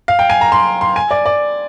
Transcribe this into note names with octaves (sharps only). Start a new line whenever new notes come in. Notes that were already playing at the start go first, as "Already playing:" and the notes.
F5
G5
G#5
A#5
C6
C6
G#5
D5
D5